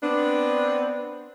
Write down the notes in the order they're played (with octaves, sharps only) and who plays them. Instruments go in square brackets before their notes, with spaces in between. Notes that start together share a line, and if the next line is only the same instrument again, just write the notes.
[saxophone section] B3 C4 D4